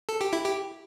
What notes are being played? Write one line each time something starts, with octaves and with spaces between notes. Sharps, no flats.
A4
G4
E4
G4